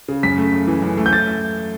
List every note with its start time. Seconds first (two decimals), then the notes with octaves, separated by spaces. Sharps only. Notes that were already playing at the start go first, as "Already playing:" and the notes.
0.08 C#3
0.23 F#2 B6
0.37 A3
0.53 F#2
0.67 E3
0.82 F#2
0.97 A3
1.06 G6
1.13 A6